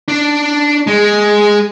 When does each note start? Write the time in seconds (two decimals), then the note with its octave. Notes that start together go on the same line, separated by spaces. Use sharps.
0.08 D4
0.87 G#3